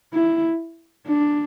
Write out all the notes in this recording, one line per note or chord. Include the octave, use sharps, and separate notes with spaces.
E4
D4